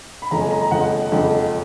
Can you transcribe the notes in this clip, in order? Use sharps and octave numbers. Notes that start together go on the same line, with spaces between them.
B5
F#1 F2 F3 G#3 A#5
G#5
A#5
A#5
F#1 F2 F3 G#3 F#5
F#1 F2 F3 G#3